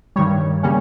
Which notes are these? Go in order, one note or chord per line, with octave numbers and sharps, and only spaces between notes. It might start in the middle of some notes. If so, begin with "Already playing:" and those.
G2 D#3 G3 C#5
C#3 G3 A#3 C#4